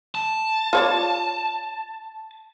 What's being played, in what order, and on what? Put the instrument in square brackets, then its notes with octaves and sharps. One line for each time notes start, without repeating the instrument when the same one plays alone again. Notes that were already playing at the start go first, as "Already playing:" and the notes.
[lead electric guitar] A5
[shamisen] F4 C#5 D5